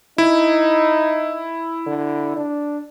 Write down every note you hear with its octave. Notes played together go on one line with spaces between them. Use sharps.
D#4 E4
D3
D4